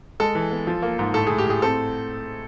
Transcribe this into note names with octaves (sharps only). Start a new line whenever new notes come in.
G#3 A4
E3
B3
F3
A#3
G#2
A2 A4
A2 G#4
G4
A2 G#4
C4 A4